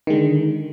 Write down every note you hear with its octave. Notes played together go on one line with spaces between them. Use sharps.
D3 D#3 G#3